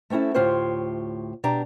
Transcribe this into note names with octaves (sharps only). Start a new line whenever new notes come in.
A3 C4 C#4 E4 A4
D2 A2 F4 G4 C5 C#5
B2 D4 G4 A#5